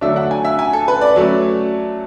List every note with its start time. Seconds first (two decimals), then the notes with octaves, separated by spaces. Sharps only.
0.01 D3 F#3 A3 D4 E5
0.16 F#5
0.31 G#5
0.45 E5
0.59 G#5
0.73 A4
0.88 B4
1.01 D5
1.16 F#3 A3 C#4